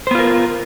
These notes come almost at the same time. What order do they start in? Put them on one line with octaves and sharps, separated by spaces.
C5 B3 F4 A#4